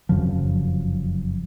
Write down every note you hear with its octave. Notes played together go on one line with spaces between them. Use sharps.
F1 F#2 C#3 F3